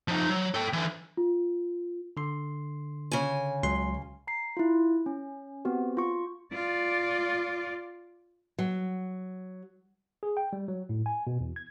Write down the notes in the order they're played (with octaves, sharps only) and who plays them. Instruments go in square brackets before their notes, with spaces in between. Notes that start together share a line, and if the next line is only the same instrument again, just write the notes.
[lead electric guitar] F3 D#4
F#3
A4 G5
D3 E3
[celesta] F4
[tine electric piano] D3 C6
[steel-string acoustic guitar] C#3 G#5
[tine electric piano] C#2 F#3 C6
[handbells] A#5 C7
E4 F4
C#4
B3 C4 F#4 G4
F4 C#6
[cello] F4 D5
[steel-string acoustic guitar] F#3
[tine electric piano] G#4
G5
G3
F#3
A2
G#5
B2
E2
G#6